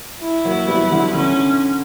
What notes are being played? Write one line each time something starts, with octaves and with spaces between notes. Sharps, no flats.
E4
F#3 A#3
G3 B3
D3 F#3
D3 C#4